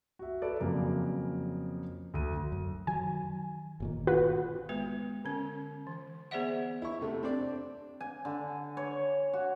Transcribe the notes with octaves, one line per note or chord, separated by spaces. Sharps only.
F#4 E5
A4 B4 D5
F2 C#3 F#3 A#3
D2 D#7
F#2
D#3 F#3 G#5
G1 A#2 D#3
F4 F#4 B4
G#3 B3 B4
D3 C#4
E3
B3 G#4 C5 D5 E5 F#5
E4 C#6
C3 A3
C4 D4 D5
G#5
D3
C#5
F#4